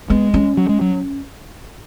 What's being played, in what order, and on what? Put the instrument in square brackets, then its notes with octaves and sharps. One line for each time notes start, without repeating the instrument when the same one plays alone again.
[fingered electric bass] G#3 [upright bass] B3
[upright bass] C#4
[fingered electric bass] F#3
G#3
F#3